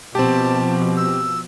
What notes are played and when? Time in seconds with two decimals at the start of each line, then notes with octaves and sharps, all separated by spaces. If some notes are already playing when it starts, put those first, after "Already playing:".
0.15 B2 F3 C4 G4 A5
0.97 E6